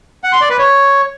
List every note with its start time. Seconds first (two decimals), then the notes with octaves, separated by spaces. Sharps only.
0.24 F#5
0.32 C6
0.41 D5
0.50 B4
0.59 C#5